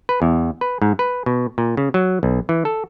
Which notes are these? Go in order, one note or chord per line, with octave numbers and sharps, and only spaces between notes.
B4
E2
B4
G#2
B4
B2
A#2
C#3
F#3
B1
E3
A4